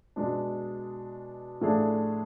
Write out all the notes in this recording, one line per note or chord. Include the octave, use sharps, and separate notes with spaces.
B2 G#3 D4
A2 F3 A3 D4 G#4